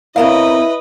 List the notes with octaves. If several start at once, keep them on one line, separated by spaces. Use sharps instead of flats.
C#3 C4 E4 A#4 B4 D#5 F5